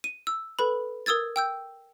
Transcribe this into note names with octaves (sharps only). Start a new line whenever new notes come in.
D#7
E6
A4 B4 B5
A#4 D#6 E6 G#6 A6
G5 E6 G6